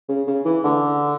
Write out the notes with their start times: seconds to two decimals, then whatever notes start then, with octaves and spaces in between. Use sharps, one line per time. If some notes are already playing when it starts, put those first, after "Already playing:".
0.09 C#3
0.27 C#3
0.45 E3
0.64 D3